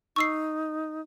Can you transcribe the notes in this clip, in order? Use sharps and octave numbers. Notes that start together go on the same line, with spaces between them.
D#4 C#6 E6 C7